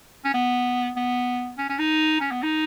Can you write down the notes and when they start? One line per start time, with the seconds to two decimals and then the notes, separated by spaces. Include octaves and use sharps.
0.25 C#4
0.34 B3
0.97 B3
1.58 C#4
1.69 C#4
1.79 D#4
2.21 C#4
2.32 B3
2.43 D#4